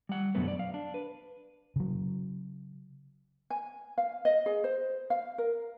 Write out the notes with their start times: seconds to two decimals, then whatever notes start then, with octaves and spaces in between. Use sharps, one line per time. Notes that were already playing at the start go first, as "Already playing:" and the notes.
0.09 G3 F#5
0.35 F#2 B2 D3 F#3 A3 B3
0.48 D5
0.59 F5
0.74 D4
0.94 B4
1.76 C#3 F#3
3.50 G#5
3.98 F5
4.25 D#5
4.46 G#4
4.64 C5
5.10 F5
5.38 A#4